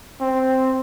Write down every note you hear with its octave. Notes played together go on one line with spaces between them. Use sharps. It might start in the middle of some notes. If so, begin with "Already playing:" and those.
C4